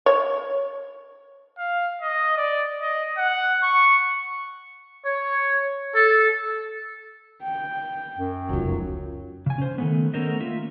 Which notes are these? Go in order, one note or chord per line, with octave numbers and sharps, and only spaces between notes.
C#5
F5
D#5
D5
D#5
F#5
C#6
C#5
A4
G5
F#2
F1 C#2 F#3
C#3 G#5
C#4 C5
D#3 A3 B3
A3 B3 C#4 A#4 C5 D#5
A#3 F4 E5